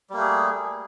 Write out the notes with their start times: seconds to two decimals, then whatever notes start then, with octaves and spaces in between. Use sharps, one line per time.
0.10 G3
0.13 A#3
0.17 A3
0.21 G#4